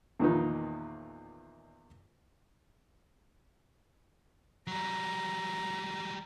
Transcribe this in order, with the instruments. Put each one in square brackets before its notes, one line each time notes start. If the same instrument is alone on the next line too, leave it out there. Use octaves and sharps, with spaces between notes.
[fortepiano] E2 A#2 D#3 F3 B3 D#4
[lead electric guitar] F#3 G3 [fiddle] A#5